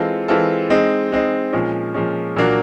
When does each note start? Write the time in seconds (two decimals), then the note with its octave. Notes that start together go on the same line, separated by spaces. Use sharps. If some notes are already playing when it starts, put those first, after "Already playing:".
Already playing: E3 G#3 C4 F4 A4
0.28 E3 G#3 C4 F4 A4
0.70 G#3 C4 D#4
1.12 G#3 C4 D#4
1.53 A#2 F3 G#3 C#4
1.94 A#2 F3 G#3 C#4
2.36 A#2 F#3 A#3 D4 F#4